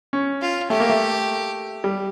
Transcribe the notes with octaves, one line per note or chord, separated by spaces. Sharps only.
C#4
F4
A3 G4
A#3
A3
G3